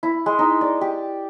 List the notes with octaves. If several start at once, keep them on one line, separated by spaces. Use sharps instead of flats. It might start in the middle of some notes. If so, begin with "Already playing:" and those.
E4
G#3
D#4
D5
G4